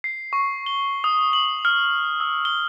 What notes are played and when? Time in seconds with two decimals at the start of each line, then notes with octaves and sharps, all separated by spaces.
0.04 C7
0.33 C#6
0.66 G7
1.04 D#6
1.33 F#7
1.65 F6
2.20 E6
2.45 G7